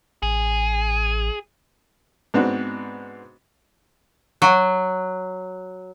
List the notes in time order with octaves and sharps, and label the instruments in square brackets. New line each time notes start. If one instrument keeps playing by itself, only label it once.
[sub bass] A1 [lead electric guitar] G#4
[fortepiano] G#2 B3 C4 D4 F#4
[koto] F#3